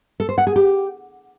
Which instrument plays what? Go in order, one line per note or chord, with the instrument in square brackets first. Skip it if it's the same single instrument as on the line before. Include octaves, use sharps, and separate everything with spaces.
[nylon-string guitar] A4
C5
F#5
G#4
G4